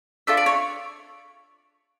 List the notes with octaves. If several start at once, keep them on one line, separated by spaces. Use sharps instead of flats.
D4 F4 A4 E5
D5
C#5